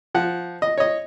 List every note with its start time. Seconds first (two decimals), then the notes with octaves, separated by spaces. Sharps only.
0.15 F3 F#5
0.62 D#5
0.78 C#5 D#5